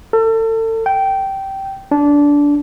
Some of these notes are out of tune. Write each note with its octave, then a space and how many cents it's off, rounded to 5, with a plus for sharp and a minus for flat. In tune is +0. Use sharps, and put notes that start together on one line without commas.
A4 +35
G5 -15
D4 -15